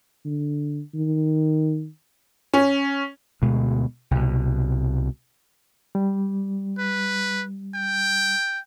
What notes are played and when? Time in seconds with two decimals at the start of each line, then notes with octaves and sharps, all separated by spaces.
0.25 D3
0.94 D#3
2.54 C#4
3.42 D2 B2 G#3
4.11 C2 B2
5.95 G3
6.79 B4
7.74 G5